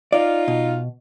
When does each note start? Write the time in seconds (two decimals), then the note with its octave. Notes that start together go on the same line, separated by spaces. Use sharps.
0.12 D#4 F4 D5
0.48 B2